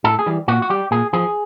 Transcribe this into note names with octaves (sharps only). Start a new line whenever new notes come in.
A2 A4
G#4
E3 G3
A#2 F#4
F#4
G3 G4
A#2 G#4
F3 G#4